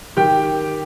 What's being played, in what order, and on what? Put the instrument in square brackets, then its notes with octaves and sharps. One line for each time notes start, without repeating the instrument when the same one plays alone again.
[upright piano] D#3 G4 G5